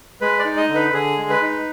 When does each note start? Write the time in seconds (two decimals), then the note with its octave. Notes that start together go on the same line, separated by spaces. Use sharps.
0.21 G#3 B4
0.39 D5
0.45 D#4
0.57 D#5
0.69 D3
0.75 B4
0.93 D3 G#4
1.18 G#3
1.30 B4
1.42 D#4